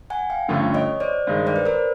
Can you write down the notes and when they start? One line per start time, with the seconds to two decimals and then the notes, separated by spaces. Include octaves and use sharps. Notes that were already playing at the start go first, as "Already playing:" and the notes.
0.10 F#5 G#5
0.30 F5 G5
0.48 G2 D3 F3 A3 C#4
0.74 C#5 D#5
1.00 C5 D5
1.27 G2 D#3 G#3
1.46 C5 D5
1.56 B4
1.66 A#4 C5